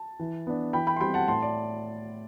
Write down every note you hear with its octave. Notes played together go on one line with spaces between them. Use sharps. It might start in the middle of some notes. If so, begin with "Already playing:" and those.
Already playing: A5
E3
B3 D4
E3 G5 B5
G5 B5
C6
G3 C4 G5 B5
F#5 A5
A2 A5 C6
D5